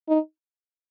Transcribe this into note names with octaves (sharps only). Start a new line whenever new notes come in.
D#4